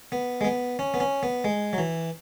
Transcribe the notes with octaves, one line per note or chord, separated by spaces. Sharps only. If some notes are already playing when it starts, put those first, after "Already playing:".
B3
G#3
B3
C#4
B3
C#4
B3
G#3
F#3
E3